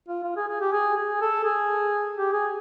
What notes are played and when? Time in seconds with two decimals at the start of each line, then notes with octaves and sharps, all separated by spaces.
0.08 F4
0.24 F4
0.36 G#4
0.48 G#4
0.61 G4
0.72 G#4
0.96 G#4
1.21 A4
1.44 G#4
2.18 G4
2.33 G#4